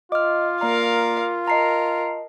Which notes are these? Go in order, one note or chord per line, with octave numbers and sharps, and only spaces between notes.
F4 D#5 D6 F6
A#3 A#4 D5 F5 A#5
A#4 D#5 A5 A#5 C7